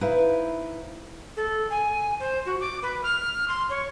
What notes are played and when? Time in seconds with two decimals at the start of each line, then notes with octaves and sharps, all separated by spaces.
0.01 D#4 E4 B4 C5 E5 F5
1.36 A4
1.70 G#5
2.19 C5
2.45 F#4
2.60 D6
2.82 B4
3.03 F6
3.48 C6
3.69 C#5